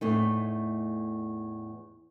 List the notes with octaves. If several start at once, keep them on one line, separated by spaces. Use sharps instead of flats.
E2 A2 A3 D#4